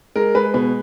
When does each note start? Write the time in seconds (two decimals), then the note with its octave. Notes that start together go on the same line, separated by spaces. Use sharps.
0.16 G#3 A#4
0.35 G#3 B4
0.54 B2 B4